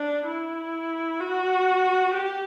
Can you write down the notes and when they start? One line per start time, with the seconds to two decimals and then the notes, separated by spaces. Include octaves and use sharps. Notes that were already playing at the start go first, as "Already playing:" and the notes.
Already playing: D4
0.26 E4
1.20 F#4
2.14 G4